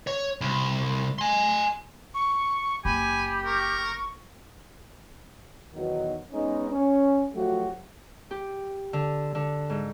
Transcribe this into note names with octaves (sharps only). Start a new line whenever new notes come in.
C#5
C2
G#5 C6
C#6
F#1 G4 G#5 B5
A#4 C#6
E2 B2 D#3 F#3 D#4
G#3 B3 C#4 D#4
C#4
F3 F#3 A3 F#4 G4
G4
D3
D3
G#2